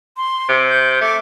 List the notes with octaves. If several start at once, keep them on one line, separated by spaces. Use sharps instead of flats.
C6
C3
G6
A3 D6